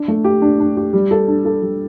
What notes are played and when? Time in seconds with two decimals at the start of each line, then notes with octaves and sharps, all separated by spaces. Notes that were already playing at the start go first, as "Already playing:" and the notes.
Already playing: D4
0.08 A3
0.24 G4
0.42 D4
0.60 D4
0.77 G4
0.93 G3
1.11 A4
1.28 D4
1.45 A4
1.62 G3